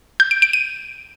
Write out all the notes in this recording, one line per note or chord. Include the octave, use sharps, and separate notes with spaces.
G6
D7
D7
D#7